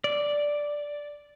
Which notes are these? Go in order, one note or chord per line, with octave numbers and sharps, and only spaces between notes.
D5